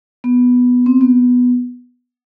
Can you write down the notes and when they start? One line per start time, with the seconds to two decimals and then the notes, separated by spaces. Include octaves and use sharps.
0.24 B3
0.86 C4
1.01 B3